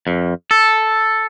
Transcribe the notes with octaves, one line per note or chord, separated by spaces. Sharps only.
F2
A4